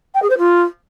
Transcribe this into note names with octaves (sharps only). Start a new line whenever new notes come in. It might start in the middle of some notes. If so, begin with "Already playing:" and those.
G5
G#4
C5
F4